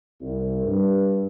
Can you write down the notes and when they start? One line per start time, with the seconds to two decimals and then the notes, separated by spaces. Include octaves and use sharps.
0.21 C2
0.65 G2